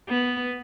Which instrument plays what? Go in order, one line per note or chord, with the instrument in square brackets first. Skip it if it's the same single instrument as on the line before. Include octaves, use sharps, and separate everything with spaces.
[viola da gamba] B3